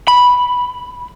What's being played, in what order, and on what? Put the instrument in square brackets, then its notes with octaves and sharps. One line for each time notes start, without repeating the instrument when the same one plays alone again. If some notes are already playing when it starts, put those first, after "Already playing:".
[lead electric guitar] B5